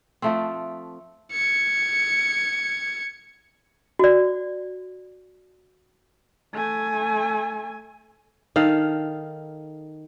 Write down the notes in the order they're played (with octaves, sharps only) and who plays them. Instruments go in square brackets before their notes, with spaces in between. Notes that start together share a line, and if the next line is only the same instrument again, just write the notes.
[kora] F3 A3 C4
[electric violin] G#6 C#7
[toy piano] F#4 D5
[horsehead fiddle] A3 G#5
[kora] D#3 A4 F5